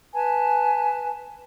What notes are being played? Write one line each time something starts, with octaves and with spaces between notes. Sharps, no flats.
B4 G#5 A5